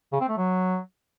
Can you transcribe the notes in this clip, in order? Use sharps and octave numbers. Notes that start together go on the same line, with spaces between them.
C#3
C4
A3
F#3